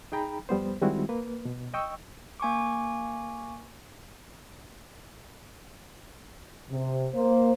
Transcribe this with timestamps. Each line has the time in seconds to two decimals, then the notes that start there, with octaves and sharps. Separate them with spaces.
0.12 D#4 G#4 G5 A#5 B5
0.49 F2 G3 B3 C5
0.81 D#3 G3 G#3 C4 E4 F#4
1.09 A#3 B4
1.45 B2
1.74 D#5 G5 C#6 E6
2.40 A#3 G#5 C#6 D6
6.71 C3
7.15 A#3 C5